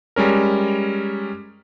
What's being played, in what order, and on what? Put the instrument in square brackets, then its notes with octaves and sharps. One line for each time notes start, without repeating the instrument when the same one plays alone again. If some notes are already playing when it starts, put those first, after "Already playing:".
[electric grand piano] G3 G#3 C#4 A#4